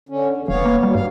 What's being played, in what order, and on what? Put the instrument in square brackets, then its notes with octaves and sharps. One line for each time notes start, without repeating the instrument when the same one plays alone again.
[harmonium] D3 C#4
E2
[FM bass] D#1 [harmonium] B3 C#5 F5
[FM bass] A#3
[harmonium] F#3 [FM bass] G3
[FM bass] G2 [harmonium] F5